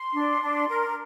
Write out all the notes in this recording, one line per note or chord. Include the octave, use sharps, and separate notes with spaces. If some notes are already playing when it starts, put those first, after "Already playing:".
Already playing: C6
D4
D4
A#4